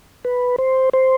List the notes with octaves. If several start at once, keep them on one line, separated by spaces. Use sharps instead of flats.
B4
C5
C5